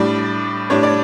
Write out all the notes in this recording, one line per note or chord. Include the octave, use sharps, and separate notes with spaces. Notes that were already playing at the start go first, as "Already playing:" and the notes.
Already playing: A2 G3 D4 D5
A2 G3 D4 C#5
D5